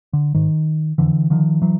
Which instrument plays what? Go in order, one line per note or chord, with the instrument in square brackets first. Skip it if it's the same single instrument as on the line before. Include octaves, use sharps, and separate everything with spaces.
[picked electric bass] D3
G#2 D#3
F2 D3 E3
D3 D#3 F3
E3 F#3